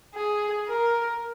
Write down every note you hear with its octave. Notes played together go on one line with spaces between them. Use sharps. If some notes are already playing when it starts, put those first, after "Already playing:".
G#4
A#4